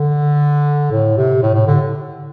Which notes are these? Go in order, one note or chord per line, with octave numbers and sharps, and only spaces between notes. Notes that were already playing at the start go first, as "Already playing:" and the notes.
Already playing: D3
A2
C3
A2
A2
D3